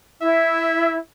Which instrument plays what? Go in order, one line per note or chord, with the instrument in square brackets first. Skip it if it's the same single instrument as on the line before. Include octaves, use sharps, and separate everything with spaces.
[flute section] E4 [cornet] E5